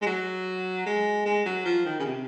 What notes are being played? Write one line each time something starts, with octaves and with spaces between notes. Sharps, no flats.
G#3
F#3
G#3
G#3
F#3
F3
D#3
C#3
C3